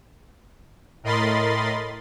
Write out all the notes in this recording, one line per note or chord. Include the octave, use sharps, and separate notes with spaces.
A2 A#4 D#5 B5 C6 A6